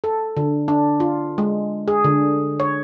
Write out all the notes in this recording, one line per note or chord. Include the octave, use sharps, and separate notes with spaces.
A4
D3
D4
F4
G#3
G#4
D3
C#5